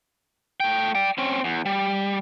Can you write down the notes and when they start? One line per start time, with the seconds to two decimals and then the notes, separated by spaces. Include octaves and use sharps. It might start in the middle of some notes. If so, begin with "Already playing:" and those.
0.60 A3 G5
0.95 D5 G5
1.18 C4 C#4
1.44 E2
1.66 G3